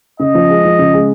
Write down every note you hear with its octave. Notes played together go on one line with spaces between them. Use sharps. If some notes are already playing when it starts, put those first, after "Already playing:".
C#3 D#5
F3
G#3
F3
C#3
G#3